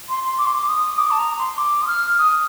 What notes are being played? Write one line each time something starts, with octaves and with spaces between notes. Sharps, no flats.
C6
C6
D6
C6
D6
D#6
D6
A5
A#5
C6
D6
D#6
F6
D#6